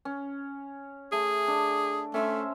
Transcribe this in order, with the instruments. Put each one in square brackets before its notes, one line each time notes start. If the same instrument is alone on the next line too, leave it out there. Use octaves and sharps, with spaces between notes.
[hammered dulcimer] C#4
[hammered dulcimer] A3 [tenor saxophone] G#4
[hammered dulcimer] D4
[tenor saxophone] A3 [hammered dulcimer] C#4 C5 E5